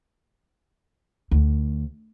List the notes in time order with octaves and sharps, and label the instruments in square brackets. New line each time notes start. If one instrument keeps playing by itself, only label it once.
[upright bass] D2